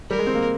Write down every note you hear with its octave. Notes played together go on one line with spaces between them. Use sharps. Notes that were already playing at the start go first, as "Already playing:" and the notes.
G3 A#4
G#3
C4
A#3